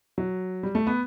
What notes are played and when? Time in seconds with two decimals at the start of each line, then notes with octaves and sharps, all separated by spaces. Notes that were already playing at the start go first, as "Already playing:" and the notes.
0.18 F#3
0.63 G3
0.75 A3
0.87 B3